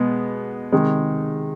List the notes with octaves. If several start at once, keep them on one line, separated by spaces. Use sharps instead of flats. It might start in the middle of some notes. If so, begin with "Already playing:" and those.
Already playing: B2 G#3 B3
C3 D#3 G#3